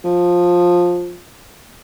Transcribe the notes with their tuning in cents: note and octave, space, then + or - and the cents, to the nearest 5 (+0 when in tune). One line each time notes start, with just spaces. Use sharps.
F3 +15